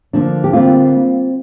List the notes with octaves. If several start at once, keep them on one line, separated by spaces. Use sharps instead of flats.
D3 F3 A#3 D4
G4
D3 G3 A#3 C4 F4